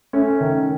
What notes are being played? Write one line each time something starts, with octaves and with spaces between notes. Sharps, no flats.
A3 C#4
D#3